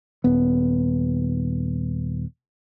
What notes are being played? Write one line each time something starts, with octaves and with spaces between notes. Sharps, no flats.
D#1 B3